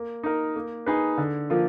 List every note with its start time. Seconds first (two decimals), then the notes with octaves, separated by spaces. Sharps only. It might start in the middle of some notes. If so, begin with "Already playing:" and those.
Already playing: A#3
0.23 D#4 A#4
0.56 A#3
0.86 D#4 G#4 B4
1.18 D3
1.50 F3 A#3 F4